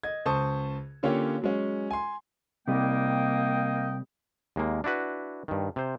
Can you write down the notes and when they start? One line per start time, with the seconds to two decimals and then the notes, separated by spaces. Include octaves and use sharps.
0.03 D#5 G#6
0.25 C#2 C5 A5 C#6 D#6
1.03 D3 A#3 C#4 F4 G4 C#5
1.42 F#3 G#3 C#4
1.91 G#5 C6
2.68 C3 G3 A#3 D#5 G5
4.56 D#2 G#3 A#3
4.84 D4 E4 F#4 B4
5.48 G2 D#3
5.76 C3 C5